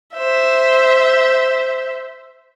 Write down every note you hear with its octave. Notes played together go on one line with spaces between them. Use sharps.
C5 E5